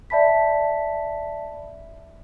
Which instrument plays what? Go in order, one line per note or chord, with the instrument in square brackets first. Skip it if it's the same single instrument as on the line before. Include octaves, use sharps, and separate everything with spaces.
[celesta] D5 E5 A5 B5 B6